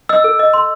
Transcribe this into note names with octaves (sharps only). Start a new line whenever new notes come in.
D#5 E6
A4
D#5
C6